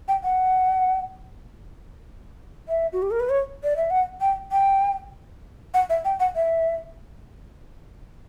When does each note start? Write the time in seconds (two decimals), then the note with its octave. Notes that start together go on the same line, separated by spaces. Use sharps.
0.08 G5
0.24 F#5
2.69 E5
2.93 F#4
3.02 G4
3.11 A#4
3.20 B4
3.29 C#5
3.64 D5
3.77 E5
3.90 F#5
4.21 G5
4.52 G5
5.74 F#5
5.90 E5
6.05 G5
6.20 F#5
6.36 E5